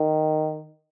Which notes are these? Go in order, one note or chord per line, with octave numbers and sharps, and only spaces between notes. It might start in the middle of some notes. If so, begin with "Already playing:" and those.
Already playing: D#3